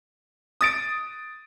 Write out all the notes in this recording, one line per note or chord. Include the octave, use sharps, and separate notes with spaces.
D#6 A6 D7